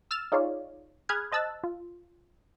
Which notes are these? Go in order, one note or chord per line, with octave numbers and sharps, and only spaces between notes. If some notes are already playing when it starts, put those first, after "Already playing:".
E6 F6 A6 E7
D#4 F4 G#4 C#5 D5 F5
G#4 B5 D#6 F6 F#6 G#6
C5 D#5 A5 E6 F#6 A6
F4